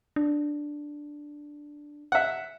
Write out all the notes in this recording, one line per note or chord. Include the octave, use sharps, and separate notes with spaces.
D4
E5 F#5